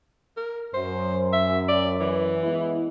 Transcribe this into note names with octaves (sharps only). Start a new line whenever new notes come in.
A#4
F#2 C5
E5
D5
E3
G#3 B3 E4